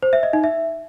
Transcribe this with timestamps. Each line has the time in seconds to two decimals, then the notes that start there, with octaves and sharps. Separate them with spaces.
0.02 C5
0.13 E5
0.23 D#5
0.33 D#4
0.44 E5